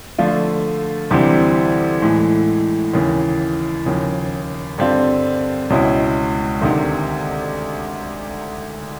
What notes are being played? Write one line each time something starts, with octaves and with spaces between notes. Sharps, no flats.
D3 F3 A3 D4 F4
D2 C3 E3 G3 C4
A2 E3 G#3
D#2 C#3 E3
D#2 C#3 F3
G2 D3 G3 C4 F4
C#2 B2 G#3 C#4 E4
D2 C3 D#3